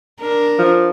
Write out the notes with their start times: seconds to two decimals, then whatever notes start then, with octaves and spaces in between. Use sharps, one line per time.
0.20 D4 A#4
0.59 F3